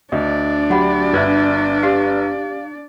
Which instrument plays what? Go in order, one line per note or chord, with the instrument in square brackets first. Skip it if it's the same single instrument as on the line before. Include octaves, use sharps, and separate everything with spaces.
[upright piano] D2 [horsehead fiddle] D4 D5 [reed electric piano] D#5
[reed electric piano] F#3 G4 [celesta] F#4 F#5 B5
[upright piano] G1 [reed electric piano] E5 F#6 G#6
[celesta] G4 [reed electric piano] F5